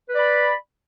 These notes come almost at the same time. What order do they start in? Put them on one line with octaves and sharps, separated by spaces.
B4 D5 B5